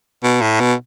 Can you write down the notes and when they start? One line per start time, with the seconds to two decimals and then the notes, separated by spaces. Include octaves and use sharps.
0.23 B2
0.41 A2
0.60 B2